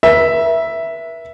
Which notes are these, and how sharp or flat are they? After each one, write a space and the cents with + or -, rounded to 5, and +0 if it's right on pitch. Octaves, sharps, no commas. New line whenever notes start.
B4 -45 E5 +0